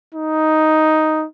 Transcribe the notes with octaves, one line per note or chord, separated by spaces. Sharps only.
D#4